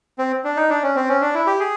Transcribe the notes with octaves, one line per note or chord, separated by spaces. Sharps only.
C4
D4
D#4
D4
C#4
C4
C#4
D4
E4
G4
G#4